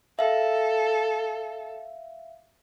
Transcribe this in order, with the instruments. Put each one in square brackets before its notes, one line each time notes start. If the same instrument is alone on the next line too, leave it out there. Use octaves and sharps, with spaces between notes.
[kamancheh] A4 [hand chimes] E5 F5